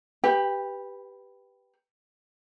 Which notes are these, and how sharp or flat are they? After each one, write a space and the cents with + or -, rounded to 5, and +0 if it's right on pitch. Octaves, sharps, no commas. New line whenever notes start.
G4 +0 B4 +0 G5 +30